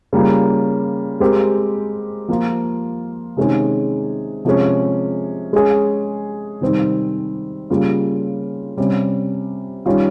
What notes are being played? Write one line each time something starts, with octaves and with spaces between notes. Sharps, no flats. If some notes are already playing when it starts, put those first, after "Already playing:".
C#3 G3 A#3 F4
G#3 C4 G4 A#4
F3 A#3 F4
C3 D#3 G#3 C#4 G#4
C3 F3 G#3 C#4 G#4
G#3 C#4 G#4
C3 D#3 G3 C4
C#3 G3 A#3 C#4 F4
C3 G3 C#4
D#3 G3 C#4 F4